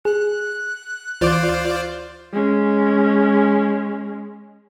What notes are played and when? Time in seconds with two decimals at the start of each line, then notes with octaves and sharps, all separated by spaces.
0.05 G#4 F#6
1.21 D2 E3 F4 C5 D5 D6
2.33 G#3 C#4